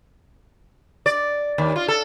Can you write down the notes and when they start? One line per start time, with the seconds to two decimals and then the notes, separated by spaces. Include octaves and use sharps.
1.06 D5
1.58 D#2
1.76 F4
1.88 A4